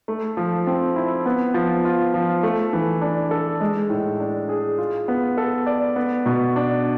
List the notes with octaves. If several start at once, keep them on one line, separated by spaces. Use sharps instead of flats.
A3
F3
C4
E4
B3
F3
F4
F3
A3
E3
D4
A4
G#3
A2
D4
G#4
F4
B3
A4
D5
B3
B2
D4